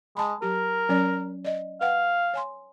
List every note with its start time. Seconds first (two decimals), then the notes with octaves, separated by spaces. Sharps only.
0.17 G#3 A5 B5
0.42 F#3 G4 A#4
0.89 F#3 C#4 D5
1.45 D5 D#5
1.81 B4 F5 F#5 G#5
2.34 C#5 G#5 C6